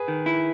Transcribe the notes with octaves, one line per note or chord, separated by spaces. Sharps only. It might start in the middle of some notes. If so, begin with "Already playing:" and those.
Already playing: G#4 B4
D#3
E4